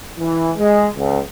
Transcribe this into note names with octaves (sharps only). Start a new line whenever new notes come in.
E3
G#3
C#2